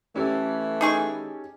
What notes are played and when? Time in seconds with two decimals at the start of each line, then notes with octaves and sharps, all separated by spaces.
0.16 E3 A3 C#4 G4 A4
0.81 D#4 G#4 C#6